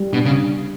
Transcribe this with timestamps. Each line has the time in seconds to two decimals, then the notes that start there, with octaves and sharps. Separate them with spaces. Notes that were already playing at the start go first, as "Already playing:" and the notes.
Already playing: G3
0.12 B2 D4
0.25 C#3